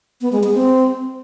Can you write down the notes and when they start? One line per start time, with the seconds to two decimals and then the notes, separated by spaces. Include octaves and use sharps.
0.21 B3
0.32 G#3
0.43 G#4
0.54 C4